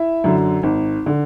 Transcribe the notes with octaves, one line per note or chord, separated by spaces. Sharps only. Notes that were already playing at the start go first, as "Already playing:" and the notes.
Already playing: E4 E5
F#2 D3
G#1
D3